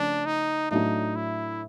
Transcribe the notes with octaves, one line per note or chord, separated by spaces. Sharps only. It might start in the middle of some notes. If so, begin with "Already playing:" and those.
Already playing: C#3 F3 A3 C#4 D4
D#4
A2 F#3 A3 D4 D#4
E4